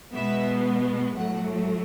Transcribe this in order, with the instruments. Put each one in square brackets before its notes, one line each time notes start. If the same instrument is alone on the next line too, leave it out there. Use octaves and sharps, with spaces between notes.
[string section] B2 G#3 B3 E5
A2 F#3 A3 F#5